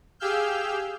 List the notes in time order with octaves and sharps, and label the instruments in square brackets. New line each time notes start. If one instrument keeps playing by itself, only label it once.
[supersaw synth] G4 G#4 F5 E6 F6 G6